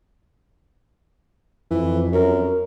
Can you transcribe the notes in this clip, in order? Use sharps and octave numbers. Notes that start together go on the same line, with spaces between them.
F2 E3
F#2 A#4